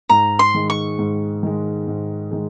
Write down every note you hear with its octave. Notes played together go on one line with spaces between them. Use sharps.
G#2 A#5
C6
D#3 G#3
C#6
G#2
D#3 G#3
G#2
D#3 G#3